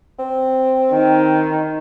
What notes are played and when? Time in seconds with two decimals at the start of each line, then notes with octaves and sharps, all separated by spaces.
0.19 C4
0.93 D#3